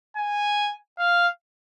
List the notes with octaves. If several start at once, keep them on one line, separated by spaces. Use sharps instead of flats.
G#5
F5